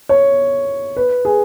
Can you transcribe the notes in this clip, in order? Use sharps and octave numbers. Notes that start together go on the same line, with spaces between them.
C#5
B4
G#4